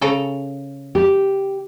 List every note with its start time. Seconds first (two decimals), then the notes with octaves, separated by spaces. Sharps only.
0.01 C#3 A4 A#5
0.95 G4